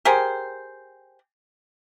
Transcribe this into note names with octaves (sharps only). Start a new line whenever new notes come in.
G4 G#4 A#4 C5